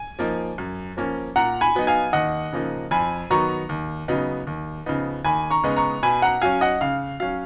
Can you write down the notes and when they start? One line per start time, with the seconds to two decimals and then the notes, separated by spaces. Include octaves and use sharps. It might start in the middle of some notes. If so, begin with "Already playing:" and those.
Already playing: G#5
0.19 F3 A#3 D#4
0.58 F#2
0.97 F3 A#3 C#4
1.36 A#2 F#5 A#5
1.61 G#5 B5
1.75 F#3 B3 D#4
1.87 F5 G#5
2.13 D#2 D#5 F#5
2.52 C#3 F3 A#3 D#4
2.91 F2 G#5 B5
3.30 D#3 F#3 B3 D#4 A#5 C#6
3.69 D#2
4.08 C#3 F#3 B3 D#4
4.47 D#2
4.86 C#3 F3 B3 D#4
5.25 D#2 G#5 B5
5.51 A#5 C#6
5.63 C#3 G#3 B3 D#4
5.76 A#5 C#6
6.03 B2 G#5 B5
6.22 F#5 A#5
6.41 F#3 C#4 F5 G#5
6.61 D#5 F#5
6.81 C#3 F5
7.20 F#3 C#4 F5